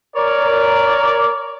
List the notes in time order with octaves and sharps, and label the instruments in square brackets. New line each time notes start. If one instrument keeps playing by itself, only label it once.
[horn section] A#4 C#5 D5